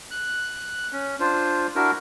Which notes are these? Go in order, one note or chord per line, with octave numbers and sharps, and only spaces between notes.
F#6
C#4
D4 F4 C5
D4 E4 F#4 A#4